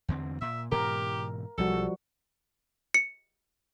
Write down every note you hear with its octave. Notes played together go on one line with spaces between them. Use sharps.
E2 D3 C4
A#2 E5
G#2 B2 E3 G4 A#4
B1 F3 G3 F#4 A4
C#7